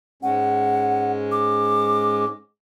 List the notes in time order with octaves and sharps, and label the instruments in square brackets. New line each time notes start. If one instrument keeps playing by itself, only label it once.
[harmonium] G#2 G#3 C#4 [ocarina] F#5
[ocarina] D6